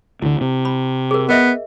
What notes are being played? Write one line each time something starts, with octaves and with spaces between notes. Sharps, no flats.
D2 D3 E4
C3
B5
G#4 A#4
B3 A#4 D#5 E5